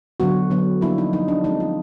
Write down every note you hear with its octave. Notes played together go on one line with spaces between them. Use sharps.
D3 F#3 B3 F#4
D3 F#3 B3
F3 A#3 D4 E4
D#4
F3 A#3 D4 D#4
D4
F3 G#3 C4 D#4
F4